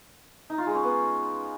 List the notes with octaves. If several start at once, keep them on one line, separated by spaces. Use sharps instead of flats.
D#4
F4
G#3
C#4
B3